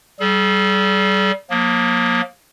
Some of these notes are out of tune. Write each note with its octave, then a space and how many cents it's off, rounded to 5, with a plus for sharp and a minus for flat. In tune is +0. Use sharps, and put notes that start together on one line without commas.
G3 -25 G#4 +40
F3 +40 A#3 +15